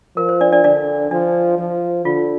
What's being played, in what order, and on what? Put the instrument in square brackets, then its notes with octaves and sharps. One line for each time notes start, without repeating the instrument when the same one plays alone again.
[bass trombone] F3 [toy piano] A#4
[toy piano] C5
D4 D5
D4 D5
[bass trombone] D3 [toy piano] D4 D5
[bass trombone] F3 [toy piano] D4
[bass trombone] F3
[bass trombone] D3 [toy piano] F4